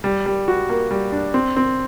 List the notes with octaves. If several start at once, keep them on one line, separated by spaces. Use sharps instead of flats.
G3
G3
F#4
A#3
G3
D4
C4
C4